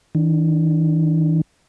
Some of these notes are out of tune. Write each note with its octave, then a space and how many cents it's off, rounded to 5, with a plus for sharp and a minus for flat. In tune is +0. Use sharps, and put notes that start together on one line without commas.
E3 -45 D4 +0